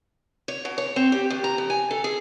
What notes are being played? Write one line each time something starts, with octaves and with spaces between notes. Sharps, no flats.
C#5
B2
C#5
C4
G4
D#2
A#5
F2
G#5
A4
G#4